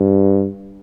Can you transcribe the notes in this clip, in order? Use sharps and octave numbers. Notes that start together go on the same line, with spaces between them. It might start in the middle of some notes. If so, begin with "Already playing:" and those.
Already playing: G2